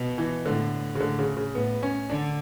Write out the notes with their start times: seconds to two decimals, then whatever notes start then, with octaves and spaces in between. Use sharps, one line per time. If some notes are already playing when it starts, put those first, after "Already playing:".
Already playing: B2
0.18 E3
0.45 A2 D3
0.95 C#3
1.00 A2 D3
1.19 C#3
1.37 C#3
1.55 A2 B3
1.83 C#4
2.10 D3 D4